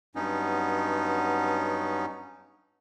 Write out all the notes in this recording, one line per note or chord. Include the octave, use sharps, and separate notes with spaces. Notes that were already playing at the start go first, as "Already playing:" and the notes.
G2 F#3 B3 C#4 D#4